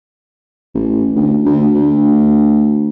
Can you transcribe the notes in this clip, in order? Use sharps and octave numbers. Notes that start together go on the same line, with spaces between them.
A1
D2
D2
D2